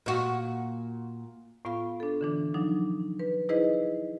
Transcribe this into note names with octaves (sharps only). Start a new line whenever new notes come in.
A#2 F#4
A2 B3 F4 F5 C#6
D4 A4
D3 E3 D4
F3 F#3 D4 D#4
B4
D#4 E4 G#4 B4 C5 D#5